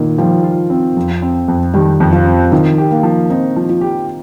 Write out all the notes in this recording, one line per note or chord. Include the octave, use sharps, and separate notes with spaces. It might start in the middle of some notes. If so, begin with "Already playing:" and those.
Already playing: A#2 D#3
F3 G3
F4
C4
F2
C4
F2
D#3 G3
F2
F3
C4
D#3 F3
G4
A#3
F3
C4 D#4
F3
F4
G4